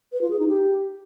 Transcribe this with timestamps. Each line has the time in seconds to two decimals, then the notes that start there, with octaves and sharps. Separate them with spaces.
0.12 B4
0.21 F4
0.30 G#4
0.39 D#4
0.48 G4